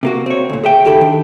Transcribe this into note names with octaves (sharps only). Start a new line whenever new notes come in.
C3 A#3 F#4
C4 C#5
D2 A#2
G#4 E5 G5
C#2 D#3 G4 A4 G5 B5
D#3 D4